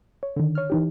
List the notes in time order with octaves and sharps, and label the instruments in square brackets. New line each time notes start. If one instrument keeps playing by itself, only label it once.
[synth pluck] C#5
D3 D#3
C#5 F6
E3 D#4 G4